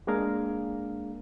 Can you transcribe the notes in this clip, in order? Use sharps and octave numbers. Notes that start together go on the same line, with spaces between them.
G#3 A#3 D4 G#4 A#4 F5